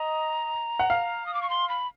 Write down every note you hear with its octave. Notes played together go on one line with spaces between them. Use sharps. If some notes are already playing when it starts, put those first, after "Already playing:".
Already playing: D#5 A#5
F#5
F5
D#6
D6
C#6
C6
B5